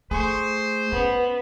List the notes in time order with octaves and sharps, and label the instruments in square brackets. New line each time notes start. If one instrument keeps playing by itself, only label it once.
[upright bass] A3 [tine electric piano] G#4 C6 C#6 [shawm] C5
[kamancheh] B3 [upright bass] C#4